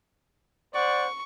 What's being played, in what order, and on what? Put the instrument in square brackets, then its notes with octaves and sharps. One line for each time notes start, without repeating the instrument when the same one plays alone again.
[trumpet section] C5 D5 F#5 [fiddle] C#6